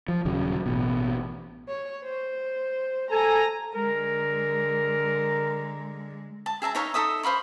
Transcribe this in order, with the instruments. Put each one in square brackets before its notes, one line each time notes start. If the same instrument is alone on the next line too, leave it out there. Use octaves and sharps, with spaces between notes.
[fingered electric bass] F3
D#1 C#3 F#3
A1 B2
[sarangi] C#5
C5
[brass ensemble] A4 G#5 [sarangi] A#5
[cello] D3 G#3 [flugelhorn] A#4
[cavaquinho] A5
G#4 E5 A5 A#5
D#4 C#5 E5 F5
D#4 A4 E5 D#6
C5 F5 B5 C#6